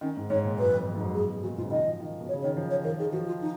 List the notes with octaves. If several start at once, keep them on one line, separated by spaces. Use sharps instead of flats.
D#3 C#4
G#2
G#2 C#5
A#2
F#2 B4
F2
F2
G#2
F#2
A#2 G#4
B2
A#2 F#4
G#2 F4
C#3
D#3 D#5
F3
D#3
B2
C#5
C#3
D#3 C#5
F3
C#5
F3 A#4
D#3 G#4
F3 F#4
F4
D#4